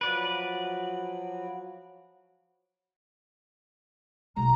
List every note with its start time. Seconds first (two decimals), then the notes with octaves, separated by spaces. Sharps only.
0.01 F3 F#3 F#4 B4 D5
4.36 B1 G#3 A#5